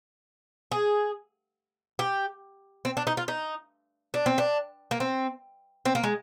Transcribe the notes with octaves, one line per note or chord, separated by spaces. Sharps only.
G#4
G4
C4
D4
D#4
F4
D#4
D4
C4
D4
A#3
C4
C4
A#3
G#3